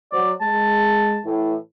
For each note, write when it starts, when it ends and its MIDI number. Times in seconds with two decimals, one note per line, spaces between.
0.12 0.32 54
0.12 0.32 72
0.12 0.31 74
0.41 1.17 56
0.41 1.24 81
1.24 1.54 45
1.24 1.54 52